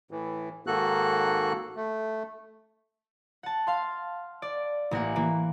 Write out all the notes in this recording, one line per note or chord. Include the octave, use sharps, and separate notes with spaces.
A2 E3
G#2 D#3 A#3 F#4 A4 F#6
A3
F#5 A5
F5 C6
D5
A1 A#3 A#4 F#5 G#5
E3 A#3